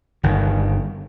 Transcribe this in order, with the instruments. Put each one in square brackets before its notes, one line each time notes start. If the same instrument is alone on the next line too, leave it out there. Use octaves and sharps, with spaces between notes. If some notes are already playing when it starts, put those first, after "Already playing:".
[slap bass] G1 D#3